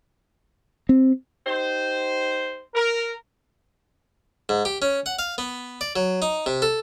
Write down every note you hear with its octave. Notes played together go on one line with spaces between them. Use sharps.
C4
D#4 G4 C5
A#4
G#2
G4
C#4
F#5
F5
B3
D5
F#3
D#4
C3
A4